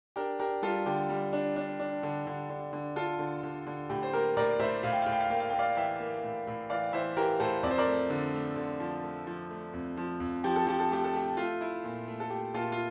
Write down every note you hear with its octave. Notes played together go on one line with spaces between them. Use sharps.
D4 G4 A#4
D4 G4 A#4
G3 F4 A4
D3 G4
G3
D4
D4
D4
D3
D3
D3
D3
D3 F4 A4
D3
D3
D3
A2 G4
C5
A#3 G4 A#4
A2 A#4 D5
A2 C5 E5
A2 F5
G5
A2 F5
G5
F5
A#3 G5
F5
A#3 G5
D5 F5
E3 E5 G5
A#3
A2
A2
E3 D5 F5
E3 C5 E5
E3 G4 A#4
A2 A4 C5
F2 D5
C5
A#4 D5
A3
D3
A3
D3
F3
A3
F3
A3
F2
F3
F2
F3 G4
A4
F3 G4
A4
A3 G4
A4
A3 G4
A3 F4
E4
A#2
A3
A4
A3 G4
A#2 F4 A4
F4